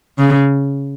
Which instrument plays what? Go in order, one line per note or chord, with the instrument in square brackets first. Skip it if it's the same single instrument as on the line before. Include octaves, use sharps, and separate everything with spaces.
[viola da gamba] C#3